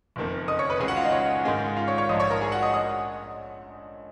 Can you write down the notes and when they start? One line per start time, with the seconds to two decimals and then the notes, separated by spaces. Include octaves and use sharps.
0.16 F#1 F2 D#3 A#3
0.48 D#5 D#6
0.59 C#5 C#6
0.70 B4 B5
0.80 C#2 C#3 G#3 G#4 G#5
0.88 F#4 F#5
0.97 F4 F5
1.04 D#4 D#5
1.12 C#5
1.45 G#2 D#3 G#3 C#4
1.76 F4 F5
1.88 C#5 C#6
1.98 C#5 C#6
2.09 A#1 G#2 F3 D#5 D#6
2.20 C#5 C#6
2.30 A#4 A#5
2.41 G#4 G#5
2.52 F#4 F#5
2.63 D#5 D#6
2.74 D#5 D#6